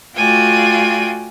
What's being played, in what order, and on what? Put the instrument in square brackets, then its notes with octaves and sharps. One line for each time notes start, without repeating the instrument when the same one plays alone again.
[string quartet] A3 F4 F#4 D5 G5 G#5